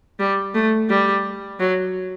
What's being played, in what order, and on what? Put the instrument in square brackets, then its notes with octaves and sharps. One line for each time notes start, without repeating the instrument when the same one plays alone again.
[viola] G3
A3
G3
F#3